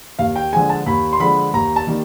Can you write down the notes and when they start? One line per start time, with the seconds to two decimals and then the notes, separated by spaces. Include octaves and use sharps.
0.19 D#2 F5
0.36 G5
0.53 D3 F3 G#3 G#5
0.70 A5
0.86 D#2 B5
1.13 C6
1.20 D3 F3 G#3 B5
1.54 D#2 A#5
1.76 A5
1.87 D#3 G3 A#3